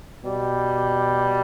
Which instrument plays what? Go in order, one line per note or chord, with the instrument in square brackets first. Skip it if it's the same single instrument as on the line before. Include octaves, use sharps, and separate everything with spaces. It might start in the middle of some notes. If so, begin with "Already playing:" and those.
[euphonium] B2 [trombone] G3